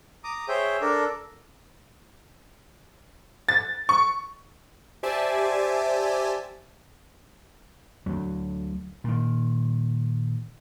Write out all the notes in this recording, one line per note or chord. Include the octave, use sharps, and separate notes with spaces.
A#5 D6 D#6
G#4 C5 C#5 E5 G5
D4 A4 A#4 D5
A6
C#6
G4 C5 D5 E5 G#5 A5
D2 F#3
A#2 D#3